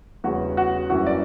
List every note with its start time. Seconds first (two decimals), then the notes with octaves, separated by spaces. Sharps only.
0.24 E2 C#3 G3 C#4 F#4
0.57 F#4
0.90 F#2 E3 G3 A#3 C#4 F#4
1.06 D5